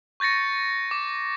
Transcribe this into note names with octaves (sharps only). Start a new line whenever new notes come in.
C#6 G6 A6 A#6 C#7
D6